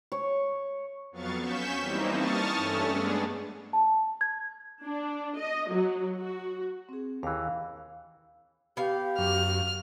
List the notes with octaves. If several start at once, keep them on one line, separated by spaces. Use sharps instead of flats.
C#5
F2 F#3 B3 F5 C#6 A6
C#4 C#6 G6 B6 E7
E3 G3 A#3 C4 D#4
A5 C#6 D#6 F6 A6
G2 A3 C#4 A4
G#3 B3 D4 G#4
A5
G#6
D4
D#5
F#3
F#4
C4 G#4
D#2 E3 F5
B3 G4 F5
F#2 F6